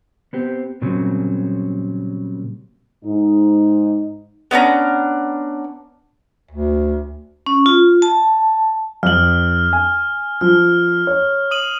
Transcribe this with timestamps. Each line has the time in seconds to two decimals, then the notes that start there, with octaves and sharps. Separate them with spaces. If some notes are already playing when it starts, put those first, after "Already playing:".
0.33 B3 C4 G4
0.82 A#2 C#3 F#3 G3 C4
3.05 G#2 D#4
4.51 B3 C#4 D4 A#5
6.51 D2
7.46 C#4
7.66 F4
8.02 A5
9.03 F2 F6 F#7
9.73 G#5
10.41 F3 F6
11.07 C#5
11.51 D#6 D#7 F#7